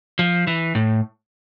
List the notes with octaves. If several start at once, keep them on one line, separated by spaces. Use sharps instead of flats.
F3
E3
A2